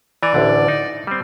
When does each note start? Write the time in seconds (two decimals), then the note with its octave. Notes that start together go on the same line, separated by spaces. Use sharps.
0.23 E3 D5 G#5 A#5
0.34 A1 D2 D3
0.68 D#4
1.07 G3 C4